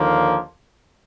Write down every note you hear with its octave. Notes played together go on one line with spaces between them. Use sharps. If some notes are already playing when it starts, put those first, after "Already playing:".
Already playing: D#2 D3 F3 A#3